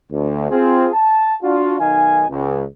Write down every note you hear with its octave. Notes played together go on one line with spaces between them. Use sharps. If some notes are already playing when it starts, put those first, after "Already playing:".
D2
C4 F4 G#4
A5
D4 F4 F#4
B1 D#3 D#4 F5 G#5
C#2